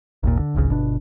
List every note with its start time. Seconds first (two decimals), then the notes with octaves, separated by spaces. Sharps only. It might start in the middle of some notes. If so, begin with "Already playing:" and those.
0.23 G#1 D#2 A#2
0.39 D3
0.55 D1 G#1 C#2 C#3
0.71 G1 B2 D4